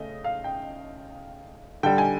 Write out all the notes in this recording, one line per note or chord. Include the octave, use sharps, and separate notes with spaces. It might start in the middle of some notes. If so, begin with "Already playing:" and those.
Already playing: C#3 A3 D#5
F5
G5
D3 G3 G5
G#5